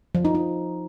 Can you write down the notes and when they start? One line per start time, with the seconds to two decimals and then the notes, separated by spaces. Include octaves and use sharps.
0.15 F3
0.25 D#4
0.35 D#4